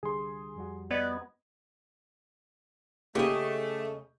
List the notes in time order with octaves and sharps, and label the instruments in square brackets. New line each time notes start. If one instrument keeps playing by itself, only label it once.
[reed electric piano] C2 D3 G3 [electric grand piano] G#4 C6
[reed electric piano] F2 G3 F#4
[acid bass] B3 [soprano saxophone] D5 [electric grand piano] D#5 G#6
[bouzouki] C#3 D#5 [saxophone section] A3 [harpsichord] A#3 C#4 D#4 [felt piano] G4